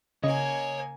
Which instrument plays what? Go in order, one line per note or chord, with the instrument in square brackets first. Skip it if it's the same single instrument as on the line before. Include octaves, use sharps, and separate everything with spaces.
[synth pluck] C#3 [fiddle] A#3 G#5 [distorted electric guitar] C#5 [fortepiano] D#5